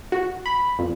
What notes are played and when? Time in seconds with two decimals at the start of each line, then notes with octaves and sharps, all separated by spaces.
0.12 F#4
0.46 B5
0.79 F2